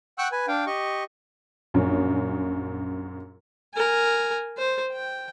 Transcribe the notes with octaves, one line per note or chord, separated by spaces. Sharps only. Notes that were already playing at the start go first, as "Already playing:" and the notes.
F#5 G5 C#6 E6 F#6
B4 G#5
D4 F5 G5
G4 D#5 C#6
A#1 F#2
A#4 G#5
C5
G5